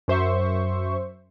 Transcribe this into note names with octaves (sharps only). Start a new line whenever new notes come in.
F#2 C5 E5 C#6